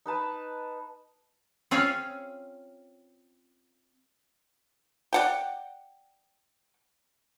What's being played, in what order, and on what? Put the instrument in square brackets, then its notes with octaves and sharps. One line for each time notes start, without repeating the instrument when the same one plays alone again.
[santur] D#4 B4 A5 B5
[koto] C4 C#4 F4 G#4 C#5
[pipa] D5 F#5 G5